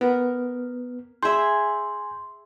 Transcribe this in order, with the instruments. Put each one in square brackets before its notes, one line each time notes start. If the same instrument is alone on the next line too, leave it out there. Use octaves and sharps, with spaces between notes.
[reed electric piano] B3 [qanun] A#4
[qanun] G#4 E5 [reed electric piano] G#5 G6 [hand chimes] C6